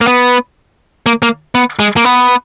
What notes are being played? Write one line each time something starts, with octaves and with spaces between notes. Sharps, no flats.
A#3
B3
A#3
A#3
B3
G#3
A#3
B3